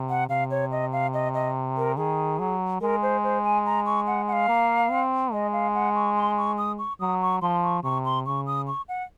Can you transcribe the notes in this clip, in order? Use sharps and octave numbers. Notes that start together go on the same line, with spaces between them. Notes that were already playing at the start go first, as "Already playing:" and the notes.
Already playing: C3
F#5
C3 F5
C#5
D#5
F5
D#5
D#5
A#4
D#3 G#4
F#3
G#3 A#4
C5
C5
G#5
A#5
C#6
F#5
F#5
F5
A#3
C4
G#3 D#5
F5
F#5
C#6
C6
C#6
D#6
C#6
F#3 D#6
C#6
F3 C6
C#6
C3 C#6
C6
C#3 C#6
D#6
C#6
F#5